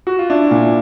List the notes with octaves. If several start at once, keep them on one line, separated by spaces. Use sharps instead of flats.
F#4
F4
D4 E4
A#2